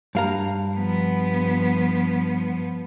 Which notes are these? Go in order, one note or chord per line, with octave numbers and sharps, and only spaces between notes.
G2 F5 A#5
F3 B3